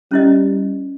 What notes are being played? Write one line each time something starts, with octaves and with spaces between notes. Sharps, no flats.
G3 C#4 E4 D#5